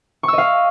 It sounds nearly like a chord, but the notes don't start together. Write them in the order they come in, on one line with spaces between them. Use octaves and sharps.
C#6 E6 D#5 F5